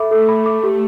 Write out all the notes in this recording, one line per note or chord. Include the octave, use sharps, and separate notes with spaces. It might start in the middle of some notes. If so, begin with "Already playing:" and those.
Already playing: A4 E5 B5 D6
A3 A4
B5
D6
G4